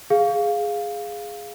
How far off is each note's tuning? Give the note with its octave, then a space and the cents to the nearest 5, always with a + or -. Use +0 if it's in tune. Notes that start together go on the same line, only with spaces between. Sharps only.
G#4 +0 F5 +5